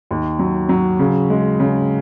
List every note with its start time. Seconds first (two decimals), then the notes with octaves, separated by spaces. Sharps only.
0.11 D#2
0.39 F#3
0.69 F#3
0.99 C#3
1.30 G#3
1.60 C#3